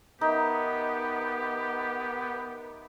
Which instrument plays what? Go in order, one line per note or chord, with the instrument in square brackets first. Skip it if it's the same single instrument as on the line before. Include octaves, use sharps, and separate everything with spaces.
[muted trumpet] B3 [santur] D#4 [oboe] G4 [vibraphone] A#4 E5